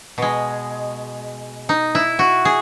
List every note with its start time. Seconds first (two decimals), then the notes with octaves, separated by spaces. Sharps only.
0.18 B2 G#3
1.69 D#4
1.95 E4
2.19 F#4
2.45 G#4